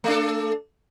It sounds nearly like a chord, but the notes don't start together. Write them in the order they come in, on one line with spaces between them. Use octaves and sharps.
A3 D4 A4